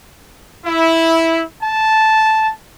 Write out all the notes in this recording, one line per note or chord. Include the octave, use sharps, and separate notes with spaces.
E4
A5